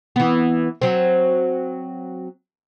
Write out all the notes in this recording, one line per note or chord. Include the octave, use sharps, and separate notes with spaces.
E3 B3
F#3 C4